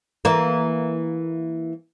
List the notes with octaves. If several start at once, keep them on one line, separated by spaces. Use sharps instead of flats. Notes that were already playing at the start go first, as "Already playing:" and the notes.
E3 A#3